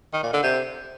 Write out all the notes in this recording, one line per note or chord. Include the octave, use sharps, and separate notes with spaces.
D#3
A#2
D3
C3